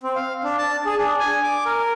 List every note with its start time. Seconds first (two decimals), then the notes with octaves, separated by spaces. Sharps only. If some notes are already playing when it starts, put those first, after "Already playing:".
0.03 C4
0.15 F5
0.44 D4
0.58 A5
0.86 G#4
0.97 D4
1.19 G#5
1.43 D6
1.65 A#4